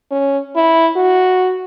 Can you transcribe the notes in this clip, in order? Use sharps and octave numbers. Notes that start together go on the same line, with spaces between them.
C#4
E4
F#4